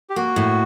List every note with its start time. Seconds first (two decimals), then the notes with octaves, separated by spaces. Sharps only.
0.10 G4
0.16 A#3 F#4
0.36 A2